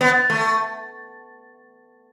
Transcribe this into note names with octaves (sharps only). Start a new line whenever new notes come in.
B3
A3